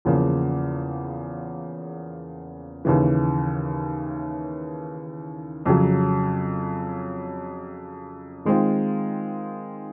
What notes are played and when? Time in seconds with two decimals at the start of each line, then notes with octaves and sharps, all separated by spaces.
0.05 E2 C#3 F3 A#3
2.85 D#2 C#3 E3
5.66 F2 C#3 F#3
8.45 D#3 G#3 C4 F4